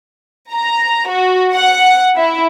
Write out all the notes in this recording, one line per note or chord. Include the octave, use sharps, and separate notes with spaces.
A#5
F#4
F#5
E4